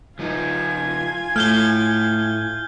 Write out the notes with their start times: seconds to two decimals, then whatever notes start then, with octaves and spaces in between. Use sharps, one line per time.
0.19 F3 D#4 F4 G#5
1.36 A2 A3 F6 G6 G7